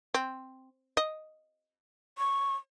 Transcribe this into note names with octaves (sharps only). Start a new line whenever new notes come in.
C4
D#5
C#6